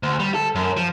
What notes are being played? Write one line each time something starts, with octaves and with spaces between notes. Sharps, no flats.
D2
G3
A4
F#2
F3